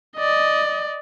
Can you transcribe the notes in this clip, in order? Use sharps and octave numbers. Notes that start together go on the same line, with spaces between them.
D5 D#5